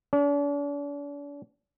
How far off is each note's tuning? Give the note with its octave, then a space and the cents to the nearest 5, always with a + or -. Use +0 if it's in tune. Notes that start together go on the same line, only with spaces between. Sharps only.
D4 -45